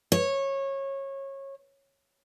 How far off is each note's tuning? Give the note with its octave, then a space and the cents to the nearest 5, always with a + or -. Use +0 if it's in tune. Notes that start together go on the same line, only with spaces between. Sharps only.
C#5 -20